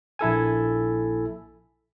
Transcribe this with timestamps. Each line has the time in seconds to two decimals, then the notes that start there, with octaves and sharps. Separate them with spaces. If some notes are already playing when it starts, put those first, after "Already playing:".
0.19 A#1 E4 A4 G#5